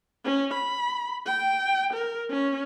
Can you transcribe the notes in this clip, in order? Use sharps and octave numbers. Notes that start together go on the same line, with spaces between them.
C#4
B5
G5
A#4
C#4